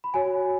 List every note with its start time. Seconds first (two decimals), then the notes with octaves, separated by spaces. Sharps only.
0.04 B5
0.14 F#4 C#5 G#5